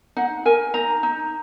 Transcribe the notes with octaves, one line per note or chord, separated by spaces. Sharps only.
D#4 F#5
A#4 G#5
D#4 A#5
D#4